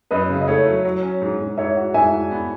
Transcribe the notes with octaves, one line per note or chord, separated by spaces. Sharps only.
F#2 B4 D#5
C#3
D#5
A3 C#5 E5
F#3
F#3
C#4
G#2
G#2
G#2 C#5 E5
F#4
G#2 E5 G#5
F#4
B3